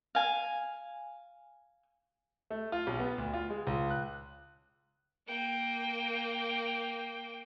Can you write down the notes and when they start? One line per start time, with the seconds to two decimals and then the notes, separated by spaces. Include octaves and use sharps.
0.15 F5 G#5
2.50 A3
2.72 F4
2.87 B1
2.99 B3
3.18 D2
3.33 F4
3.50 G#3
3.67 C#2
3.90 F#6
5.27 A#3 G5